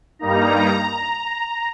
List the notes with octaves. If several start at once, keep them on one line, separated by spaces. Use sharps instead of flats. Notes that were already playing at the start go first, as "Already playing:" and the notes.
G2 G3 A#3 D#4 A#5